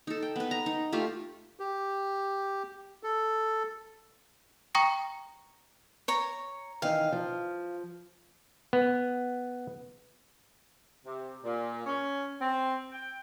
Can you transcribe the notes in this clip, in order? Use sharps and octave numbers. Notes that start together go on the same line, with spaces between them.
D#4 A4
G5
B3 B4
A#5
D#4
A3 F4 G4
G4
A4
G5 A#5 C#6 D#6 A#6 C#7
C#5 A#5
D#3 E3 D#4 F5
F3
B3
C3
A#2
C#4
C4
G5